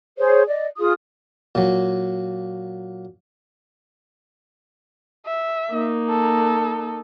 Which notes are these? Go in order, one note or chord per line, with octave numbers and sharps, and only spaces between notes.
G#4 C5 C#5
D5 D#5
F4 G#4 D#6
A#2 F#3
E5
A#3 D#4
A4